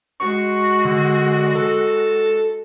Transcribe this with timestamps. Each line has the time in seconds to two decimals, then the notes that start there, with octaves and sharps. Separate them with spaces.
0.20 G#3 F#4 C#6
0.85 D3
1.55 A4